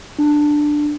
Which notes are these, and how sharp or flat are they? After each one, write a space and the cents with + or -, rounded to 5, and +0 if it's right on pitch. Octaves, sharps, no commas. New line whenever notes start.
D4 +10